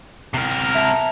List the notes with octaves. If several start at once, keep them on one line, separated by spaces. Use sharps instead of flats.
C3 A#4
E5 A5 A#5